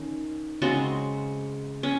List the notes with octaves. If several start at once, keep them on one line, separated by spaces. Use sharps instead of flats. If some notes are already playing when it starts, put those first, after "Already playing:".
Already playing: D#3 C#4
C#3 G#3 C4 F#4
C#4